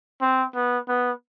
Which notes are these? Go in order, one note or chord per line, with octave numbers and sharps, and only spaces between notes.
C4
B3
B3